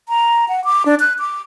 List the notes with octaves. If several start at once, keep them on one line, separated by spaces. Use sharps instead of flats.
A#5
F#5
D6
D4
F#6
D6